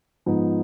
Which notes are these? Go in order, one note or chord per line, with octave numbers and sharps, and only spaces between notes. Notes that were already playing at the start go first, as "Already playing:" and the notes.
G#2 F3 B3 D#4